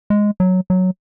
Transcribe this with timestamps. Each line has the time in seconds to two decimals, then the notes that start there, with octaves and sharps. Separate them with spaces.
0.10 G#3
0.40 F#3
0.70 F#3